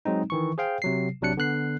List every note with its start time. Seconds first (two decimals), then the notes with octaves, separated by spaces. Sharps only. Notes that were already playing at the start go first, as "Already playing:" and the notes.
0.05 F#3 G#3 C4 D#4
0.30 D#3 E3 C#6
0.58 G#4 C5 F5 G5
0.82 C3 F#3 C7
1.21 A1 C3 F#3 D4 F#6 C#7
1.37 D3 B3 F#6 C7